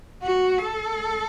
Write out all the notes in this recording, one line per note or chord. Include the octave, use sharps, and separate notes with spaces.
F#4
A4